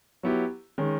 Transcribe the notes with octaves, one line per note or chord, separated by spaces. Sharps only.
F#3 B3 E4 G4
D#3 G#3 C#4